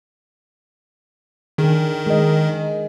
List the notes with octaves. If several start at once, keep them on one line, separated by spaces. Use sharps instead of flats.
D#3 D4 G#4
G#3 A#4 D#5